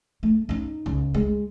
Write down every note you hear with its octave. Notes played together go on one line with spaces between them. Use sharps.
A3
C#4 D#4
C#2
G#3